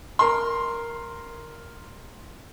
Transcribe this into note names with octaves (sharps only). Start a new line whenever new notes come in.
A#4 C6